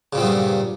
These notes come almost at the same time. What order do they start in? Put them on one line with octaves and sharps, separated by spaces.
C#3 A#2 C4 B3 G2